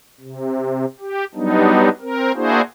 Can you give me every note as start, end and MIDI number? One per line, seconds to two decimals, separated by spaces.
0.20 0.85 48
1.00 1.25 67
1.35 1.89 54
1.35 1.89 55
1.35 1.89 59
1.35 1.89 62
1.35 1.89 63
2.01 2.32 60
2.01 2.32 70
2.35 2.61 58
2.35 2.61 62
2.35 2.61 64
2.35 2.61 66
2.35 2.61 68
2.35 2.61 72